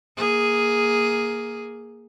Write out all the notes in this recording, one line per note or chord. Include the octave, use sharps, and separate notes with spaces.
A#3 G#4